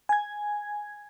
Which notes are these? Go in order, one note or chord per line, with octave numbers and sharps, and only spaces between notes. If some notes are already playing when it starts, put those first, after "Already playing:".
G#5 G#6